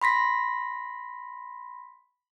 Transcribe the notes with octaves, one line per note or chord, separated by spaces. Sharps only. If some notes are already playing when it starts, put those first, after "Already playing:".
B5 C6 A#6 B6